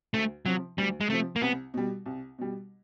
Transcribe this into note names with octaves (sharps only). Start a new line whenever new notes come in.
D2 A3
C3 F3 F#3
D2 G3
G#3
C3 F3 A3
A#3
C2 B3
B2 G3
C2
B2 G3